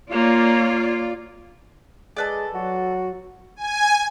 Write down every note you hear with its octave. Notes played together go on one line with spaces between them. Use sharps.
A#3 F4 C#5 D5
G#3 A4 B4 D5
F#3 F#4
G#5